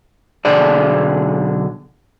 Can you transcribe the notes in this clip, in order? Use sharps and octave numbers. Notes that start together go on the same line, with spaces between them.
B1 D3 G#4 D5